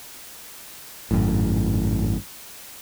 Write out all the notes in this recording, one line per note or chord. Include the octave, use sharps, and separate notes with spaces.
G#1 F#2 A2